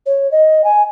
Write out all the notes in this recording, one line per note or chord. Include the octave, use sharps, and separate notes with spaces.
C#5
D#5
G#5